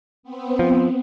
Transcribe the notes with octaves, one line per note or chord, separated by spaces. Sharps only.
B3 C4
F3